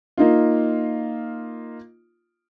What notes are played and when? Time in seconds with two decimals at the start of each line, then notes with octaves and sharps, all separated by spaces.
0.18 A#3 D#4 F4